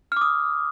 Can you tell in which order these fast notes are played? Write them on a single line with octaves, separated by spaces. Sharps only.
F6 D6 D#6